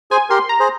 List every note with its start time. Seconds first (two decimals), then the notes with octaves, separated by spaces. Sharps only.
0.11 G#4 C5 G#5
0.30 G4 A#4 C6
0.49 A#5
0.60 G#4 C5